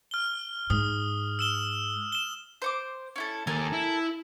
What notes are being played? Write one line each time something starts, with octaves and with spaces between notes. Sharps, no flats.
F6 G7
G#2 D#6
E6 E7 G7
E7 G7
C5 C#6 D6
C#4 E4 A4
D#2 A4 A#4 G#5
E4